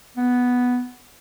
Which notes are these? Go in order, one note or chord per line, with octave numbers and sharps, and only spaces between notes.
B3